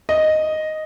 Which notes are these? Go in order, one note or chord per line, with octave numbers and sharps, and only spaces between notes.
D#5